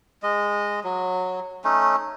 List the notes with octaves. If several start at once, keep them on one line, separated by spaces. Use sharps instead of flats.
G#3 D#5
F#3
A3 C#4 D#4